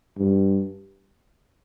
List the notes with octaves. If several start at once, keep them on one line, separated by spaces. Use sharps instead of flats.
G2